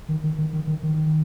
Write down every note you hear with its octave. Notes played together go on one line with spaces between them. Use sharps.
D#3
D#3
D#3
D#3
D#3
D#3